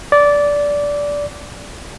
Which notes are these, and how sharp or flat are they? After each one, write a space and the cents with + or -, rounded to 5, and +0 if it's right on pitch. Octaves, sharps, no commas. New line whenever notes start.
D5 -15